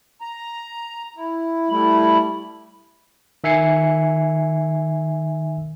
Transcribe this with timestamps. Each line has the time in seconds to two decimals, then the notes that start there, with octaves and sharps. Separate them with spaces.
0.21 A#5
1.16 E4
1.70 G3 A3 E4 B5
3.44 D#3 E5 G#5 C7 C#7